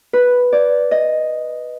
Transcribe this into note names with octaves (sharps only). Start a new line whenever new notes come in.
B4
D5
D#5